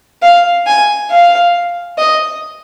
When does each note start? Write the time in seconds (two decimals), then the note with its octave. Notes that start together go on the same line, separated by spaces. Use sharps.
0.22 F5
0.67 G#5
1.11 F5
1.98 D#5